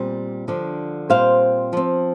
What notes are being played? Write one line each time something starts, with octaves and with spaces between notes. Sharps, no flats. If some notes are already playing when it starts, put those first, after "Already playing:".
Already playing: A#2 G3 C4
D3 F3 D4
A#2 G3 C4 C5 F5
F3 C4